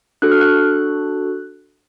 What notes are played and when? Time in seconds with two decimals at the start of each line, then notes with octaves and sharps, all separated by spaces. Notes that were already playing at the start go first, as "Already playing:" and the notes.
0.22 D4 F#4 A4 F#6
0.32 F6
0.41 F#6